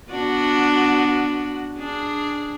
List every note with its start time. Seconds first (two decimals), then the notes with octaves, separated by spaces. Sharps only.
0.10 B3 D4 F#4
1.78 D4 G#4